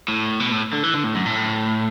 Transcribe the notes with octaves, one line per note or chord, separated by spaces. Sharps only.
A2
B2
A2
D3
E3
D3
A2
F#2
A2